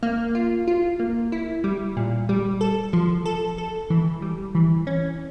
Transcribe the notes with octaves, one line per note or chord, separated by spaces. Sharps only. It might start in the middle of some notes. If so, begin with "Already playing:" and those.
A#3
F4
F4
A#3
E4
G3
A#2
G3
A4
F3
A4
A4
E3
G3
E3
C#4